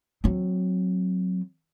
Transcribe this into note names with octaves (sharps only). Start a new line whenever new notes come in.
F#3 C4